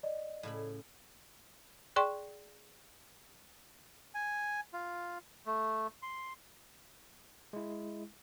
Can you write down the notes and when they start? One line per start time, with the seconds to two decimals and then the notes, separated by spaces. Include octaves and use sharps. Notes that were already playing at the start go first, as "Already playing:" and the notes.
0.03 D5 D#5
0.43 A2 C#3 B5
1.96 G#4 D5 G5 C6 C#6
4.15 G#5
4.73 F4
5.46 A3
6.03 C6
7.53 G#3 E4